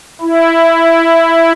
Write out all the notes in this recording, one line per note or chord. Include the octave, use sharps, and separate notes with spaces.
E4